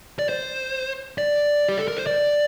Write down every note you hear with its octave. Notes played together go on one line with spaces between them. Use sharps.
D5
C5
D5
G4
A4
A#4
C5
D5